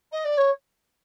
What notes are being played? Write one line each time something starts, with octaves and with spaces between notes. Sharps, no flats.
D#5
D5
C#5